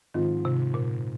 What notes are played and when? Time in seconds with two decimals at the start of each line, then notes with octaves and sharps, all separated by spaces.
0.14 G#2 D#3 F3 C4 F4
0.45 C3
0.74 A#2